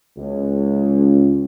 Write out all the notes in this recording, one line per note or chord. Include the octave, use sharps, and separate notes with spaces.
C#2